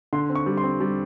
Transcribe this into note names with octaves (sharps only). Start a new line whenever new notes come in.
D3 C6
C4
C#6
G3
C6
C4
G3